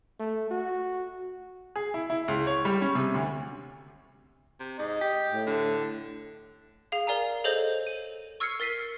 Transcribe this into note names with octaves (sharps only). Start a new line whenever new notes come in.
A3
F#4
G#4
E4
E4
C#2
C#5
G3
C#4
C3
D2
C3
G#2 D#5
G4
A2
D3
G#4 F5
A#4 D5 F5 G#5 A#5
G#4 A4 C5 C#5 D#5 G6
D#7
C#6 E6 F6 G#6 C7 C#7
A#4 A6 B6 C7 D#7 G7